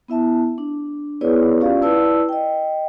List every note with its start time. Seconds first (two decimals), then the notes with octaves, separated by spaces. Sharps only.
0.08 B3 E4 E5 A5
0.58 D4
1.21 B3 E4 G#4 B4 C#5 D5
1.61 C#4 F4 G4 D5 F5
1.82 E4 B4 D5 A5 E6
2.29 D#5 G5